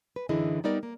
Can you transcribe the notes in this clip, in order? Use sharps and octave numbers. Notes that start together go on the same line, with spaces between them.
B4
F#2 D3 E3 E4 G#4 D#5
G3 B3 D#4 A#4 D5
A#3